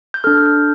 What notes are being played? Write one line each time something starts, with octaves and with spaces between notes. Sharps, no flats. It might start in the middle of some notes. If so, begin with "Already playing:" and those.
G6
D4 A4 F6
G6
F6